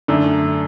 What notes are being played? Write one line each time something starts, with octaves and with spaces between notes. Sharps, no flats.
F#2 D3 A3 D4